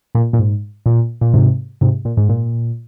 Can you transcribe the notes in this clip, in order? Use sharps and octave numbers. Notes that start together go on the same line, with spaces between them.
A#2
A#2
G#2
A#2
A#2
G#2 C3
G#2 C3
A#2
G#2
A#2